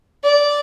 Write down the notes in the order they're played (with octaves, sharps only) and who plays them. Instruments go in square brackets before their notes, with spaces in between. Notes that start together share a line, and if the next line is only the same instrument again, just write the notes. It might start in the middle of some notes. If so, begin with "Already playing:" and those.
[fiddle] D5